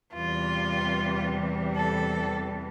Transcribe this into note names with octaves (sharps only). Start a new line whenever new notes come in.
E2 C3 E3 G3 F4
A4